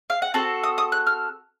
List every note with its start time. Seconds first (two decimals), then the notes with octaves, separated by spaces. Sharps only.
0.10 F5
0.22 F#5
0.34 C4 F#4 A4 A5
0.63 D#6
0.78 D#6
0.92 F#6
1.07 F6